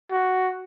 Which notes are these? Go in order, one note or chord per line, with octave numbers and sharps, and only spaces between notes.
F#4